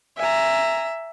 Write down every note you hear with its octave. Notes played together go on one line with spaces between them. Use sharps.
E5 G#5 A#5